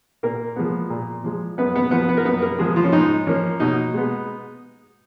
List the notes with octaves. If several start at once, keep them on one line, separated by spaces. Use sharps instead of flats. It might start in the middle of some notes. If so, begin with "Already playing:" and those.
A#2 A#3 A#4
F3 G#3 B3
A#2
F3 G#3
F#2 B3 B4
B3 B4
F3 B3 B4
B3 B4
A#4
F#2 B3 B4
A#3 A#4
F3 G#3 B3 G#4
F3 F4
C#4
G#2 D#4
F3 A#3 C#4
B2 D#4
G#3 B3